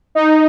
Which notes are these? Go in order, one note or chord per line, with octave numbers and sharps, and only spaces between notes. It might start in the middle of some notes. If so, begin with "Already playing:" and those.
D#4